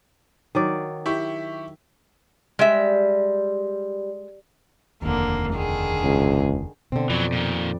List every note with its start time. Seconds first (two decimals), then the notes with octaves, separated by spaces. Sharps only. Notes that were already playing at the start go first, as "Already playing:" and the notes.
0.55 D#3 F#3 D5
1.06 E4 G4 C#6
2.59 G3 G#3 E5
5.02 F1 D#2 D3 A#3
5.52 D3 D#3 G#4
6.03 C#2
6.92 B2 D3 C4
7.10 F2 E3 F#3 D5
7.33 A#2 D#3